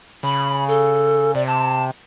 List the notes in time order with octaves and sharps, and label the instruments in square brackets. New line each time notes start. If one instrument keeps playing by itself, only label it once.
[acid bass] C#3 [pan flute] B5
[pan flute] A4
[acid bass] C3 [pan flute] D5
[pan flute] A5